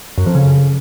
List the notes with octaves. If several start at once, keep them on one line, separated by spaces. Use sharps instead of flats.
F#2
F2
C#3